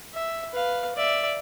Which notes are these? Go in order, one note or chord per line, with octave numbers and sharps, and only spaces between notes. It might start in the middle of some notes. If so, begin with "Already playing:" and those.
E5
B4 F5
D5 E5